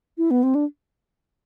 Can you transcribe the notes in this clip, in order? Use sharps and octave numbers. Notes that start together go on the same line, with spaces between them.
E4
B3
C4
D4